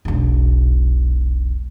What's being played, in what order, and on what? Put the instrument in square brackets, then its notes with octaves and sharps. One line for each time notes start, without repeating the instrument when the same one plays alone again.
[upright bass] E1 B1